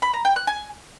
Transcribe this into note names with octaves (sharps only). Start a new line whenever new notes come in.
B5
A#5
G5
F#6
G#5